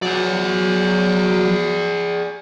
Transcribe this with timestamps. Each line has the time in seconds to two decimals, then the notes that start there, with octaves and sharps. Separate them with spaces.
0.02 F#3 G#4 D5